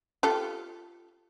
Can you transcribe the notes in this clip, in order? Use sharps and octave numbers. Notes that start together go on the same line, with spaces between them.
F4 G4 A4